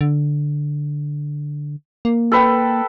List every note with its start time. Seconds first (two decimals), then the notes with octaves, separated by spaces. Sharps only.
0.01 D3
2.05 A#3
2.32 A4 B4 G5